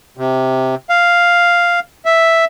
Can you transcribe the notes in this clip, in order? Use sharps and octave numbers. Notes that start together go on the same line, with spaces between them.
C3
F5
E5